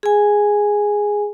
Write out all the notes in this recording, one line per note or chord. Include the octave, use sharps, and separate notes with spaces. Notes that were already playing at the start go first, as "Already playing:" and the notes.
G#4 G#5